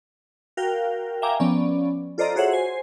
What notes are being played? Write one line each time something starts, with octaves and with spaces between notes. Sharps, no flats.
F#4 A#4 F5 G5
E5 F5 G5 G#5 A#5 D6
F3 B3 C#4 D5
F4 A4 C5 D5 D#5 A#5
F#4 G#4 C5 C#5 E5 F#5
C5 G#5 C7